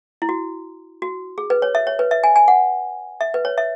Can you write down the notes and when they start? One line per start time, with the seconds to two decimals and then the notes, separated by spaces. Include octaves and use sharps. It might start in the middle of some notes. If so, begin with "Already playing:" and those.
0.22 E4
0.29 F#4
1.02 F#4
1.38 G#4
1.50 B4
1.62 C#5
1.75 E5
1.87 C#5
1.99 B4
2.11 E5
2.24 G#5
2.36 G#5
2.48 F#5
3.21 E5
3.34 B4
3.45 C#5
3.58 E5